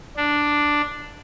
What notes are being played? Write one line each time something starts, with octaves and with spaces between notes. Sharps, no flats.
D4